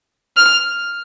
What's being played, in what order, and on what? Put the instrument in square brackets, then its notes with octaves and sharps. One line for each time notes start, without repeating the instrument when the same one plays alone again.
[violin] F6